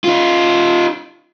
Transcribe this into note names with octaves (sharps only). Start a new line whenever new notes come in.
D#4 F4